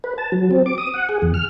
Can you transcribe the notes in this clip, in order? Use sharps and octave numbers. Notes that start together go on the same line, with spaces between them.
B4
A5
F#3
C4
D6
D#6
F#5
G#4
E2
F6